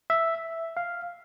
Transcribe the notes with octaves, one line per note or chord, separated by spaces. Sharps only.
E5
F5